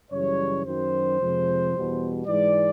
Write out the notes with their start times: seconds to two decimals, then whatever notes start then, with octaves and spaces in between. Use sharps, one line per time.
0.11 F#2 C#3 E3 G3 C#5
0.65 F#2 D#3 F#3 C5
1.19 F2 C3 F3 G#3
1.73 E2 B2 G3
2.27 G#2 E3 G#3 D5